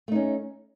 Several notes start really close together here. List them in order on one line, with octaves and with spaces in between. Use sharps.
A3 D#4 C#4